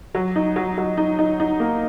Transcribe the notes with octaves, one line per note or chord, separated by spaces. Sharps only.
F#3
D#4
F#3
F#3
D#4
D#4
D#4
A#3